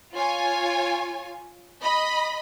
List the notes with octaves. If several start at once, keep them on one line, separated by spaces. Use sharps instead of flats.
F4 C#5 G#5
D#5 B5